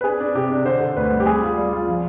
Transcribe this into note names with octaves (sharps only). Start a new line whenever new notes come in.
B4
D4 G#4
D4
C3 G4
D4
D3 C5
D3
D2 B4
G3
G4
G3 G#4
F4
G3
F4
F3